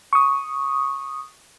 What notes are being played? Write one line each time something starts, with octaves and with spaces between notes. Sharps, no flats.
C#6 D#6